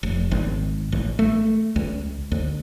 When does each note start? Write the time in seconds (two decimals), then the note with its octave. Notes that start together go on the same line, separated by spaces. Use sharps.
0.03 F1
0.31 G#1
0.92 A1
1.19 A3
1.76 C#2
2.32 D2